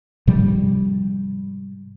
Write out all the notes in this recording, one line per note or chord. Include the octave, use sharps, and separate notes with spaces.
G#2 C3 F3 G3